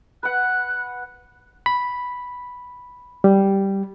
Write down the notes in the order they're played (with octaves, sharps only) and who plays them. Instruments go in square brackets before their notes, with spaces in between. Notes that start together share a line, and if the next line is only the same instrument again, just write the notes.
[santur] B4 F#5 [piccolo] F#6
[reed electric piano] B5
G3